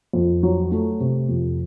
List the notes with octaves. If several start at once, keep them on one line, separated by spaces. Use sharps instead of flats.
F2
F#3
A3
C3
F2